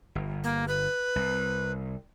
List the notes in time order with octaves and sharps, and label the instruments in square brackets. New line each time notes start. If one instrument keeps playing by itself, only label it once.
[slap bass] G1
[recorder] A#3
B4
[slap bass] C2